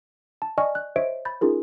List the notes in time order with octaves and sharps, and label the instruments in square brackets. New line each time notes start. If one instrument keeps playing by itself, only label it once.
[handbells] A5
D5 D#5 G#5 C#6 F6
F#6
C5 C#5 D#5 E5 D7
B5 G6 A6
C#4 D#4 F4 G#4 A#4